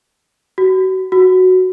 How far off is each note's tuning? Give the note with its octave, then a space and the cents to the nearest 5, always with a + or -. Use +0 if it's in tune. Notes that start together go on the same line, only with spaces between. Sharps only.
F#4 +30
F#4 +0